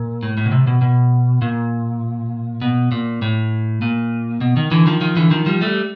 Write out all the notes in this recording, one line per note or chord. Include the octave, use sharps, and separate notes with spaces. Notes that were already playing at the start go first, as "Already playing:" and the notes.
Already playing: A#2
A2
A2
B2
C3
B2
B2
A#2
B2
A#2
A2
A#2
B2
D#3
D3 E3
D#3 F3
D#3 F3
D3 E3
D#3 F3
F3 G3
G3 A3